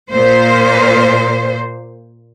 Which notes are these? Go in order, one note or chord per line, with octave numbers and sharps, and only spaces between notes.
A#2 C5